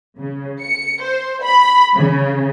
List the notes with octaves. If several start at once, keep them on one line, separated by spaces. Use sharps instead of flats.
C#3
C#7
C5
B5
C#3